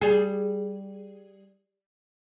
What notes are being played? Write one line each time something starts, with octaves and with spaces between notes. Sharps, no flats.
G3 G#4